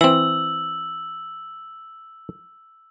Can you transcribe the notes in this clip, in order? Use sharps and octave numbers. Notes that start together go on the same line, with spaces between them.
E3 C4 E6 F#7